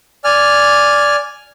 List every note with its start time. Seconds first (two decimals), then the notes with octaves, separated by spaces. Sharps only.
0.24 D5 G#5 F6